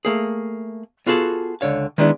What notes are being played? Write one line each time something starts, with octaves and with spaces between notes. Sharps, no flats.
A3 A#3 G#4
B3 F4 F#4 G#4 A4
C#2 D3 C#5 F5
D#3 G#3 B3 D4 E4